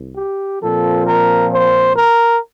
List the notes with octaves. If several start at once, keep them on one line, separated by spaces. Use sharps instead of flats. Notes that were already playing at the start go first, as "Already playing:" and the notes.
Already playing: C2
G4
A#2 F3 C4 A4
A#4
C5
A#4